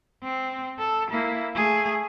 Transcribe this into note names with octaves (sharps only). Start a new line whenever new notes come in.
C4
A4
A#3 E4
A3 G#4